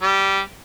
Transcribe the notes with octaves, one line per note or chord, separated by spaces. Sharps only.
G3